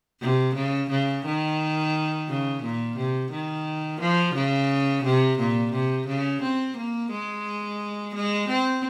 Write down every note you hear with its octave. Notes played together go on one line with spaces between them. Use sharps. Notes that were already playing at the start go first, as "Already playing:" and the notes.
C3
C#3
C#3
D#3
C#3
A#2
C3
D#3
F3
C#3
C3
A#2
C3
C#3
C4
A#3
G#3
G#3
C4